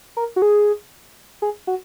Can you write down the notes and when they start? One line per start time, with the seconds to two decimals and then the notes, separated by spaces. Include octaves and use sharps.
0.17 A#4
0.36 F#4
0.42 G#4
1.42 G#4
1.67 F#4